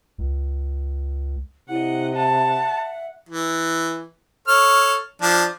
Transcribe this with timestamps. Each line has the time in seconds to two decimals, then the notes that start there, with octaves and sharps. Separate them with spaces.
0.18 C#2
1.69 C3 E4 D#5 F#5
2.16 E5 F#5 A5
3.29 E3
4.48 A4 C#5 F6
5.22 F3 D4